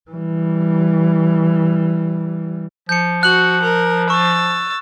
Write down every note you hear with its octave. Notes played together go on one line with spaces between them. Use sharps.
E3 G3
F3 G6 C#7
F#4 F#6 F#7
A#4
C#6 E6 A6